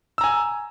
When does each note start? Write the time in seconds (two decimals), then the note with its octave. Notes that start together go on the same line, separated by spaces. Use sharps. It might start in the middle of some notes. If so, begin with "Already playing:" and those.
0.18 E6
0.21 A#5
0.24 G#5